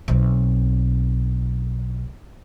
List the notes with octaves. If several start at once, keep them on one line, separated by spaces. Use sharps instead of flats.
B1 C4